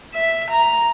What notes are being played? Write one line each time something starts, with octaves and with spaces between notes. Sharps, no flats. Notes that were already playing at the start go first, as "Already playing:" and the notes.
E5
A#5